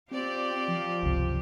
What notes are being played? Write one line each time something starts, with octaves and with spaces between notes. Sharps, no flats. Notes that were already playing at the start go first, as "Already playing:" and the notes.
C4 F4 G4 D5
F3
G1 C#2 C3